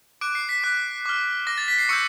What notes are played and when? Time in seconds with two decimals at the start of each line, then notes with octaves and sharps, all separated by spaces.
0.21 D6 F#6 D7
0.35 C7
0.49 B6
0.64 D6 F#6 B6
1.06 D6 F6
1.47 D6 F6 A#6
1.58 A6
1.68 B6
1.79 C7
1.89 C#6 E6 G6 C#7